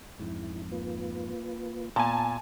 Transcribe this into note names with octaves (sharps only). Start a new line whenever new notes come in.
F2 G#2 E4
A#3 F4 B4
A#2 B3 G#5 A5